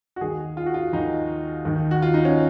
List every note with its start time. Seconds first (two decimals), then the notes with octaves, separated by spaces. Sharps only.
0.16 F#4
0.21 D#2 D#3 G#4
0.57 F4
0.66 F#4
0.74 F4
0.93 D#2 D#3 D#4
1.65 D#2 D#3
1.91 F#4
2.02 F4
2.14 D#4
2.25 C#4